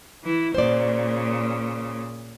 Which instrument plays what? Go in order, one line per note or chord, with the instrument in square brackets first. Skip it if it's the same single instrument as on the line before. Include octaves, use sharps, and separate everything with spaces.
[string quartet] E3 E4
[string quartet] A#2 C#3 [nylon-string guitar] C5 D5